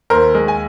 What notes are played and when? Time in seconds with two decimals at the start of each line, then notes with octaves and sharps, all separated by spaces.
0.10 D#2 A#4 C5
0.35 G#3
0.48 G#5